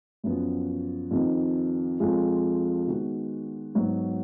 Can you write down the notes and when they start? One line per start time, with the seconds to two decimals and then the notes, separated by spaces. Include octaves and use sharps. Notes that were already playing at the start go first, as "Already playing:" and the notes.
0.24 F#2 F3 B3 F#4
1.11 F2 D#3 A#3 D#4
2.00 F2 F3 G#3
2.87 D#3 G#3 B3 F#4
3.75 G#2 F#3 B3 F#4